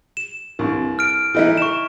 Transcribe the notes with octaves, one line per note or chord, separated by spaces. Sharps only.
E7
C2 G2 C3
F6 D7
E3 D#4 E4
C#6 E7